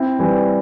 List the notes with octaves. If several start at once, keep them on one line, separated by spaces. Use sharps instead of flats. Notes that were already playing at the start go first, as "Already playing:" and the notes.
Already playing: C4 E4
E3 G3